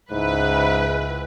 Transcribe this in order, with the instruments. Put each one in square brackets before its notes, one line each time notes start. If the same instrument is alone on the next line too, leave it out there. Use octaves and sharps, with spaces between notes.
[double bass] C#2 [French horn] G#2 [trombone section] E4 [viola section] B4